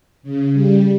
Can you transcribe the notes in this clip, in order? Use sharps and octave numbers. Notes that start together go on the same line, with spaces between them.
C#3
G3